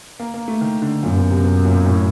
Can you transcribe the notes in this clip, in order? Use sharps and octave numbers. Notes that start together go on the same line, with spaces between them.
A#3
A#3
A3
D#3
D3
F#2 A#2
B2
C3
B2
A#2
A2